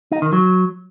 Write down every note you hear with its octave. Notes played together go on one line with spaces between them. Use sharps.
D#4
D#3
F#3